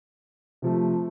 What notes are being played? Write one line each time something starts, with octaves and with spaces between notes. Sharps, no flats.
C3 F3 A3